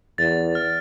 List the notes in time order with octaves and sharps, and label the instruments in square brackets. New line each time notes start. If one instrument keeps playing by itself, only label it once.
[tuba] E2 [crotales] A6
[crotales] F6